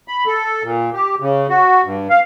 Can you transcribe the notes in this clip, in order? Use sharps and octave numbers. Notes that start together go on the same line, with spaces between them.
B5
A4
A#2
G4
C#3
F#4
G2
F5